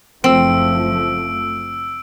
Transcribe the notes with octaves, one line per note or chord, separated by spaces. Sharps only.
F#1 F3 A3 C4 E6 D7